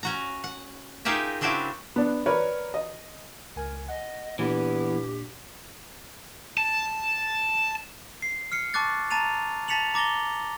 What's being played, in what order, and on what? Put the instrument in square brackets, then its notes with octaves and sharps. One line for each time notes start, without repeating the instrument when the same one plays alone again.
[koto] C#4 F#4 A#5
F#5
D#4 F4 G4 G#4 A#4 E5
C#3 C4 D4 E4 F#4 G4
[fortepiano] B3 D4
A#4 B4 C#5 D5
D#5
[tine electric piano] C#2 G#5 [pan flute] A#4
[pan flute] D#5 [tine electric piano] F#5
[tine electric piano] A#2 D4 [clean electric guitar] E3 B3 [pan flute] G4
[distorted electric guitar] A5
[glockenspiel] C7
F6 C7 C#7
A5 C#6 D6 F#6 A6
A5 A#5 A6 D#7 F7
A5 A6 B6 C#7 F7 F#7
A#5 D6 A6 A#6 G7